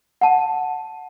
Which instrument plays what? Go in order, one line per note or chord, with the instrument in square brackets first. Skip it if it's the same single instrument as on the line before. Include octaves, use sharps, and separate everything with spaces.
[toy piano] F#5 A5